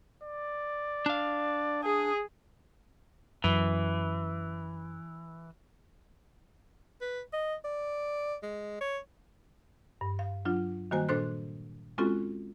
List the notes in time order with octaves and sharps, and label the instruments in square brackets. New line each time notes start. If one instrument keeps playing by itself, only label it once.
[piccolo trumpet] D5
[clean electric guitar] D4 F5
[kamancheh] G#4 [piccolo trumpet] D#6
[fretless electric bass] F#2 [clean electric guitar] E3
[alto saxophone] B4
D#5
D5
G#3
C#5
[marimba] G2
F5
F#3 D4 F4
D#3 G3 A#3 F#4 C5 G#5
A#2 D4 A4 C5 C6 F#6
G#3 C4 C#4 F4 F#4 A4